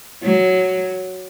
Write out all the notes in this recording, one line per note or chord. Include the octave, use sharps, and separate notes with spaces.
F#3